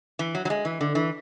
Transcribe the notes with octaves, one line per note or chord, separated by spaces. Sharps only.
E3
F#3
F#3
G#3
E3
D3
E3